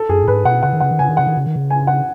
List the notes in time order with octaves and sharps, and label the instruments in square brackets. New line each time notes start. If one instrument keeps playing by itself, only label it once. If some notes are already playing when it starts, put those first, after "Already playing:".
Already playing: [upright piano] A4
[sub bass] F#2 [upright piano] G#4
[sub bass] A2
[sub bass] G#2 [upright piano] B4
[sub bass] B2 [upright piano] F#5
[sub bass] C#3 [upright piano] F#5
[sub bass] D#3
[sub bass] C#3 [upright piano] F#5
[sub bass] D#3
[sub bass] C#3 [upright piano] G#5
[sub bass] D#3
[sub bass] C#3 [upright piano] F#5
[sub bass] D#3
C#3
D#3
C#3
[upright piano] G#5
F#5